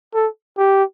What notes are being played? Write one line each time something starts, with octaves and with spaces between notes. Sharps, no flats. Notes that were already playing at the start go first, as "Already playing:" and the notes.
A4
G4